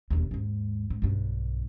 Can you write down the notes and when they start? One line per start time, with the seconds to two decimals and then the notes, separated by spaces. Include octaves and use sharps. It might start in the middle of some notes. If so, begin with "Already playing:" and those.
0.10 E1 D#2
0.31 D#2 G#2
0.90 G#2
1.02 B1 G2